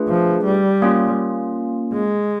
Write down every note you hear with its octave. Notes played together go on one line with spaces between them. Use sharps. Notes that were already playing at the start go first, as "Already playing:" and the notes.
Already playing: A3 D4 F4 G#4 B4
F3
G3
A#3 C#4 F4
G#3